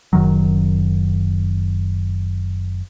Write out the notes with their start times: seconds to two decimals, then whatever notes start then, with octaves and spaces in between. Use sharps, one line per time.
0.13 F#1 F#2 D#3 F#3